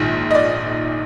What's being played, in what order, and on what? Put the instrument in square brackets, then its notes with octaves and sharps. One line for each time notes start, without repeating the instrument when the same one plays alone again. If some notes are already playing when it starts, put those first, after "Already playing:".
Already playing: [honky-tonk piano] A#1 G#2 D#3
D#5
D5